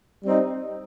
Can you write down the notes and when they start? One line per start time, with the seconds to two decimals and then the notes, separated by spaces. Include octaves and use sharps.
0.23 G3 C4 D#4